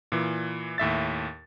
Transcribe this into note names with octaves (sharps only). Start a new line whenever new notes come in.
A#2 E3
D#2 A2 E5 A6